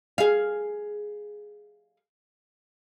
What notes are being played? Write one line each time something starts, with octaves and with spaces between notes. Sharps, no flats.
G#4 F5